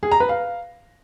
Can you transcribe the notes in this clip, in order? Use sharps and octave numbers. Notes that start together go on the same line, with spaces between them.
G#4
A#5
B4
F5